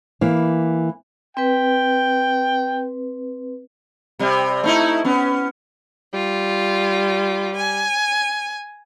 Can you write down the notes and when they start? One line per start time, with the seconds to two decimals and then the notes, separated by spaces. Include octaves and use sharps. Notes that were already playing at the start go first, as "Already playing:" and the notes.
0.21 E3 A#3
1.37 C4 B4 G5
4.19 C3 G3
4.64 A3 D#4 E4
5.04 B3 C#4
6.14 G3 F4
7.57 G#5